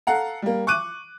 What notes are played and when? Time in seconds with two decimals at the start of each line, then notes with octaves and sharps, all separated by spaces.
0.07 A4 F5 F#5 A#5
0.42 G3 A#3
0.67 C#6 D6 F#6 D#7